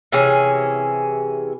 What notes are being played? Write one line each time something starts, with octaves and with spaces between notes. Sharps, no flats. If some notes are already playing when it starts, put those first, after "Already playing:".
C3 E3 C#4 G#4